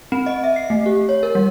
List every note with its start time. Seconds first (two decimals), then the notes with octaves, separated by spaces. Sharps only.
0.12 C4
0.26 D#5
0.44 E5
0.56 C7
0.70 A3
0.86 G4
1.09 C#5
1.23 A#4
1.35 G3